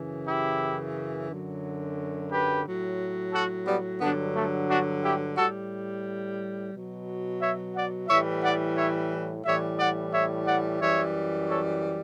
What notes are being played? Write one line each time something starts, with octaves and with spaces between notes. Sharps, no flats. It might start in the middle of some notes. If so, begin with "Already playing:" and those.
Already playing: F#2 C#3 E3
E4 G4
F#2 D3 F#3
G4 B4
A2 F#3
F#4 A4
G3 B3
G2 D3 F#3 B3 D4
A3
D4 F#4
E4 G4
A2 G3 F#4 A4
B2 F#3
C#5 E5
D5 F#5
A2 E3 G3 C#5 E5
D5 F#5
C#5 E5
A2 E3 G3 C#5 E5
D5 F#5
C#5 E5
D5 F#5
F#2 E3 G3 C#5 E5
A4 C#5